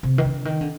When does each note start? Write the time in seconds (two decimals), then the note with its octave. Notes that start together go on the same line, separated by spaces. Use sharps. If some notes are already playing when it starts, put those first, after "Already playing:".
0.03 C3
0.18 D#3
0.25 D3
0.45 D#3
0.61 D3